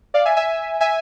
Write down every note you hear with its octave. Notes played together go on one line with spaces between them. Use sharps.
D5 F5
E5 G#5
E5 G#5
E5 G#5